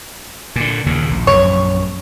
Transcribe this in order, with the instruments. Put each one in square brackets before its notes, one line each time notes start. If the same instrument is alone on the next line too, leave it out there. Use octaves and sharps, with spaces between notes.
[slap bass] A#2 D3
D#2 A#2 C#3
A#1
[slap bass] A#1 F#2 [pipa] C#5